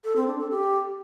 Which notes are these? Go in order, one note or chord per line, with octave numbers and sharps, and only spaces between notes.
A4
C4
D4
A4
G4